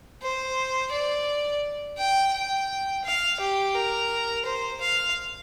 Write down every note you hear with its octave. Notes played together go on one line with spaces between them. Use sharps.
C5
D5
G5
G5
F5
G4
A#4
C5
F5